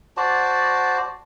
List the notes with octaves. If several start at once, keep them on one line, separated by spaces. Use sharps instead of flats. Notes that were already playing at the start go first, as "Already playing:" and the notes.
F#4 C5 D5 A5